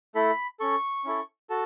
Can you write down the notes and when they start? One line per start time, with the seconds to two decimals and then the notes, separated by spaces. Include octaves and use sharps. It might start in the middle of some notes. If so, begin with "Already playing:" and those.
0.15 A3 E4 A4 B5
0.60 C#4 A4 C#6
1.05 C#4 E4 A4
1.50 F#4 A4 A5